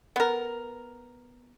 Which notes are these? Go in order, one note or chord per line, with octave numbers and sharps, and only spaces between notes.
B3 A#4